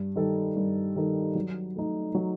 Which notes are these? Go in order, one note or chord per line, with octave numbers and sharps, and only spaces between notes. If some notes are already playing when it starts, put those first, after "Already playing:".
Already playing: G2
D#3 G3 D#4 A4
G2
D#3 G3 D#4 A4
F#3
A3 D#4
F#3